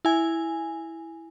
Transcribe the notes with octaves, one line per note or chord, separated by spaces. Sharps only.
E4 G#5